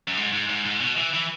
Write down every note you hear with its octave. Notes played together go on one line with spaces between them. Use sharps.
F#2
G#2
G#2
G#2
G#2
B2
E3
E3